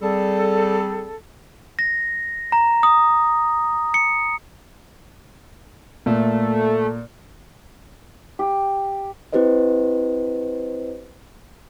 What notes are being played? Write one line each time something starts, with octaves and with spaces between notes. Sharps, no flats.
G3 C4 G#4 A4
A#6
A#5
D#6
C#7
A#2 A3
G4
C4 E4 G4 B4 C5 D#5